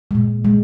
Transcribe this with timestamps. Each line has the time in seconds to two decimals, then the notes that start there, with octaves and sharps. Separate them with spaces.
0.11 A#2 G#3
0.45 G#3